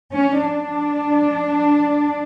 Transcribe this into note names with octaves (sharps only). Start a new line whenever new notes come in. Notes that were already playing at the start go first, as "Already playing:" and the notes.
C#4
D4